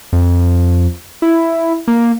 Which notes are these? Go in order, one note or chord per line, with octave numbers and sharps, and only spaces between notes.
F2
E4
A#3